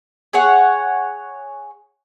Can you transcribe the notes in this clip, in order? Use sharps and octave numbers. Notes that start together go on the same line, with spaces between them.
G#4 C#5 F#5